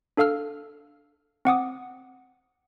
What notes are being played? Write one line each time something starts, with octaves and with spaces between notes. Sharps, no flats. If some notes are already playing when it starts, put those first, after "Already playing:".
D4 A4 F5 E6 F6
C4 F#5 D6 D#6